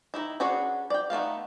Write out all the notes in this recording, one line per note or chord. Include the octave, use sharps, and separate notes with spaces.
D#3 D#4 E4
C#4 D4 F#4 G#4 B4
D5 G5
D#3 A3 B3 F5